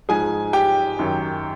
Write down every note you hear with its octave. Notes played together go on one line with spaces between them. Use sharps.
G#2 F3 G#4 G#5
G4 G5
F#2 D#3 F#3